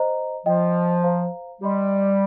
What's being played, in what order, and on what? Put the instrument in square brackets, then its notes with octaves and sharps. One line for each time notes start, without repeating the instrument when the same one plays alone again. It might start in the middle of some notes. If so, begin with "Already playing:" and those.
Already playing: [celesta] C5 D#5 A#5
[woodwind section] F3 [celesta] F4 D#5 G5
[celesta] C5 F5 A#5
[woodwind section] G3 [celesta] G4 D#5 C6